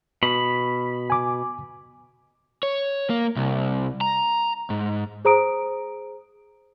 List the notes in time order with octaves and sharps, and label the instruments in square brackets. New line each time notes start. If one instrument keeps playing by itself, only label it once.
[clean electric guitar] B2 [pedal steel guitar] B5
[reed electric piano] G#5 D6
[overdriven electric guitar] C#5
A#3
C2
A#5
G#2
[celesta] G#4 C5 A#5 D#6 D7